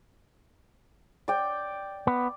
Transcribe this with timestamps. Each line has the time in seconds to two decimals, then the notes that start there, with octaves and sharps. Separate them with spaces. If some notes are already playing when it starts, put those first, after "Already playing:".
1.28 D5 G5
2.07 B3